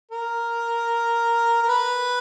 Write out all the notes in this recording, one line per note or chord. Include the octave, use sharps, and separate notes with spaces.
A#4
A#4
B4